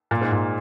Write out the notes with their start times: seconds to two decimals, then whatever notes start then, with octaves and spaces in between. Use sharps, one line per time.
0.11 A#2
0.21 G#2
0.32 A#2